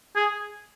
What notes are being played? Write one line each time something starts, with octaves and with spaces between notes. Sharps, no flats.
G#4